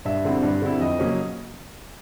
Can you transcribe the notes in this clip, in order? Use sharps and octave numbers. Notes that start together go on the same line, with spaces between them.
G2 E5
D3 G3 C4 E4
G2
D3 G3 C4 E4
F2 D#5
C#3 F#3 A#3 C#4